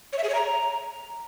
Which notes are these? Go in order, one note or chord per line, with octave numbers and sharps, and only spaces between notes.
C#5
E5
G#4
C#5
A#5